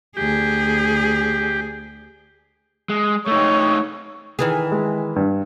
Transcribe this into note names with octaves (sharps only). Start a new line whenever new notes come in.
D2 G4 G#4
G#3
A3 D#4 C#5
D#3 E3 G#4
G#3
G2